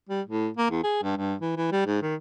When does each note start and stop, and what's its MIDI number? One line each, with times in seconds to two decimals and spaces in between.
0.09 0.21 55
0.27 0.49 45
0.57 0.70 58
0.70 0.83 40
0.83 1.02 68
1.03 1.16 43
1.17 1.35 43
1.41 1.52 52
1.56 1.70 52
1.72 1.85 55
1.86 2.01 44
2.02 2.15 51